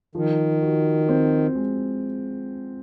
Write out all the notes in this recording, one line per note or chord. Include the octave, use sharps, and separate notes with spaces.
D#3 F3
F#4
C4
G#3